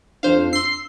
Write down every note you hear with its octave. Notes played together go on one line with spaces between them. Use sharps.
F2 D4 C5 F5
C6 E6 C7